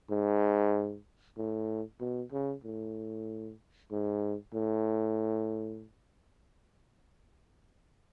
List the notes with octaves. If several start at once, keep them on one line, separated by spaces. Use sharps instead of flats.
G#2
A2
B2
C#3
A2
G#2
A2